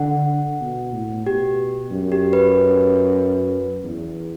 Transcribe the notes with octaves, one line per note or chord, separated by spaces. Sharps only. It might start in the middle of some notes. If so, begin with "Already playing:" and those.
Already playing: D3 F#5
B2
A2
B2 G4
F#2
G4
B4
E2